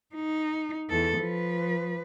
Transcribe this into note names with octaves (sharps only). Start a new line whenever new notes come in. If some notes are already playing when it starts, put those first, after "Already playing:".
D#4
E2 A4
F3 B4